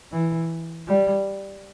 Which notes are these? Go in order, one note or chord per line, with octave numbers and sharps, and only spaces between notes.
E3
G3